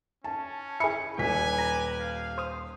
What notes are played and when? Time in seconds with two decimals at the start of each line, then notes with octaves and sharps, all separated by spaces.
0.24 C#4 A5
0.80 E4 G#4 C#7
1.18 D#1 G4 B4 G#5 B6
1.58 A#5
2.01 F5
2.38 C5 D#6